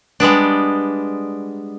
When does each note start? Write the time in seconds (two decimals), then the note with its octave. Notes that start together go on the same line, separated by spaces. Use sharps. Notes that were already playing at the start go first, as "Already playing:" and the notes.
0.20 G3 G#3 B3 D4